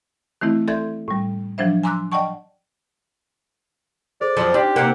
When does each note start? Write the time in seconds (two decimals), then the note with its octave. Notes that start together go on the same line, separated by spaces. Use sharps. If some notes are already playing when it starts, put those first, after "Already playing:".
0.41 D#3 E3 A3 C4 E4
0.68 A4 D5 E5 C6 G6 G#6
1.08 A2 G3
1.58 F3 F#3 D4 C5 E5
1.83 G#5 A#5 C6 D6 E6 F#6
2.12 D5 D#5 F#5 G5 A5 C#6
4.21 G#4 A4 C5 D5
4.37 F2 F3 F#3
4.54 D4 D#4 G4 C6 F6
4.76 C3 A#3 D#4 F#5 F6 D7